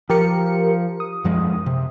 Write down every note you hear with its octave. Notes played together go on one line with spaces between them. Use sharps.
F3 G4 A#4 C#7
D#6
F#2 F3 G#3
C3